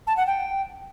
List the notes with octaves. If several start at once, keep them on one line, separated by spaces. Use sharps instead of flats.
A5
F#5
G5